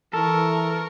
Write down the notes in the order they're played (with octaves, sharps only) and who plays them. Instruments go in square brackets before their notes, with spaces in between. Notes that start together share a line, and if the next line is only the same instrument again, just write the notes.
[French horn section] E3 [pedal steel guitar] A4 [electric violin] A#4 C#6